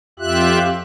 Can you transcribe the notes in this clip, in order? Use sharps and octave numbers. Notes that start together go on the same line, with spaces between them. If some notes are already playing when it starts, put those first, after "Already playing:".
F2 F4 G4 E5 F#6